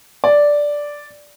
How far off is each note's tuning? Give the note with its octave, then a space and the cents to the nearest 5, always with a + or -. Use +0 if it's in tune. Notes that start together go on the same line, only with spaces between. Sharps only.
D5 -5